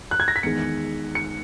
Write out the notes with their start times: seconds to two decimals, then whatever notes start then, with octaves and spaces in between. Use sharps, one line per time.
0.11 F#6
0.20 G#6
0.28 A#6
0.36 B6
0.43 E2 D#3 G#3 C#7
1.15 C#7